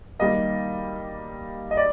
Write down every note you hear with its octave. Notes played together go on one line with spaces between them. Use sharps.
D#3 G3 A#3 D#5
D#5
D5